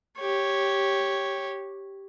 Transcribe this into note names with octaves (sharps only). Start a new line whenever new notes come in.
G4 C#5